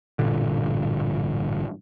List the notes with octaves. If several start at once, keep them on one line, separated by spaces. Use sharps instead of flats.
A1 G2 A#2 D3